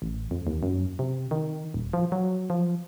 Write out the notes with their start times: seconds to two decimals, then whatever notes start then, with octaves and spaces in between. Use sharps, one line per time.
0.02 A1
0.31 F2
0.47 D#2
0.63 F#2
0.99 C3
1.31 D#3
1.74 D#1
1.93 F3
2.12 F#3
2.50 F3